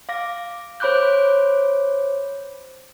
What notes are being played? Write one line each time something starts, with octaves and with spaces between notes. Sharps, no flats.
F5 D6 A#6
C5 C#5 B5 D6 F#6 G6